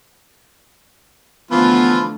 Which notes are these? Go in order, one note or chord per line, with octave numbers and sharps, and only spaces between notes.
D3 E3 F3 A3 B3 F4 B5